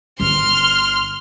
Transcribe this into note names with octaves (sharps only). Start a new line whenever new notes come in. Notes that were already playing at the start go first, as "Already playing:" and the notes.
G1 D3 C6 F6